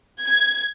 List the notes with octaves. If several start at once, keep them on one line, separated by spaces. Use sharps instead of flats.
G#6